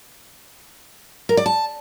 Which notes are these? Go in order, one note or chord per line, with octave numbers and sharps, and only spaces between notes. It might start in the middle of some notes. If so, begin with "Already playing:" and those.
A#4
D5
A5